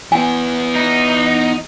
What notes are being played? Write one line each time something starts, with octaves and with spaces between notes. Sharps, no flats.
E3 B3 G#5
D#4